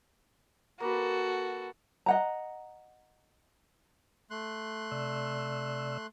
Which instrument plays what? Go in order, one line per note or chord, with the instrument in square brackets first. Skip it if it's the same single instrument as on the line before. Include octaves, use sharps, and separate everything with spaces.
[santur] A#3 B4 [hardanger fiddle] F#4 A4
[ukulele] D#5 F#5 A#5
[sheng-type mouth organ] A3 C6 F#6
[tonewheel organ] C3 D5 E6